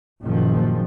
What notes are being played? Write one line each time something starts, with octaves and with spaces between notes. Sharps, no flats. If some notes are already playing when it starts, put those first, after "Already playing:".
F#1 A#2 D#3 F3